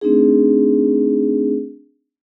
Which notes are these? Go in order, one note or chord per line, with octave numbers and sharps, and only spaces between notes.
A3 C4 D4 D#4 G#4